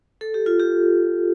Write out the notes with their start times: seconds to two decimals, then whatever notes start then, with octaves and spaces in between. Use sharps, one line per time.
0.21 A4
0.34 G4
0.46 F4
0.60 G4